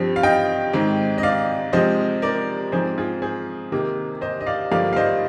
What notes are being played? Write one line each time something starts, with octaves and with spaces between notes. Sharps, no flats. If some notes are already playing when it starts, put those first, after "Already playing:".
Already playing: G2 F3 C4
F5
D#5 G5
G#2 D#3 G#3 C4
D#5
D5 F5
C3 F3 G#3 C4 C5 D#5
A#4 D5
G#2 F3 C4 G#4 C5
F4 G#4
G#4 C5
C3 D#3 A#3
C5 D#5
D#5
D5 F5
G2 D3 F3 A#3 D5 F5
F5
C5 D#5